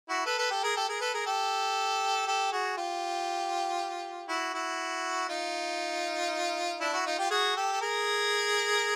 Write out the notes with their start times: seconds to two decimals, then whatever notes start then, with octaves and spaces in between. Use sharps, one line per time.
0.09 E4 F#4
0.25 A4 B4
0.38 A4 B4
0.50 G4 A4
0.63 G#4 A#4
0.76 G4 A4
0.89 G#4 A#4
1.01 A4 B4
1.14 G#4 A#4
1.26 G4 A4
2.27 G4 A4
2.52 F#4 G#4
2.77 F4 G4
4.28 E4 F#4
4.54 E4 F#4
5.29 D#4 F4
6.80 D4 E4
6.93 E4 F#4
7.06 D#4 F4
7.19 F4 G4
7.30 F#4 G#4
7.56 G4 A4
7.72 A4
7.81 G#4 A#4